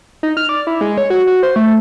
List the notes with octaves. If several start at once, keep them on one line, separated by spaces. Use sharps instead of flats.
D#4
F6
D5
E4
G#3
C#5
F#4
F#4
C5
A3